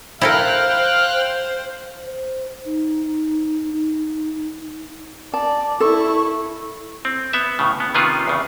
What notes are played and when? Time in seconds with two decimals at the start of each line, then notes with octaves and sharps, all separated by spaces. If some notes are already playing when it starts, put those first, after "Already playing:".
0.21 E4 A4 A#4 C5 F5 G5 F6 F#6
2.05 C5
2.65 D#4
3.72 D#4
5.33 D5 A5
5.80 E4 A4 C#6
7.05 C4
7.33 B3 E5
7.59 A2 C#3
7.80 B3
7.94 C3 D#3 B3 C#4 F4 G#4
8.28 E2 C#3